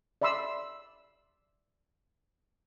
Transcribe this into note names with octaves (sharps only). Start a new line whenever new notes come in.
D5 E5 B5 C6 E6